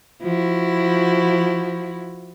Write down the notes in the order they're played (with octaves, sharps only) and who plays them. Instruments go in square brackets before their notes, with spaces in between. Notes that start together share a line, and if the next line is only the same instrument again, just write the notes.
[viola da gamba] F3 E4 F#4